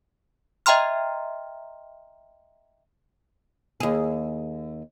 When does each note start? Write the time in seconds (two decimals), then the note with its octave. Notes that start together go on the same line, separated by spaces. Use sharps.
0.66 D#5 E5 G5 A#5 C6 F6
3.80 D#2 G#4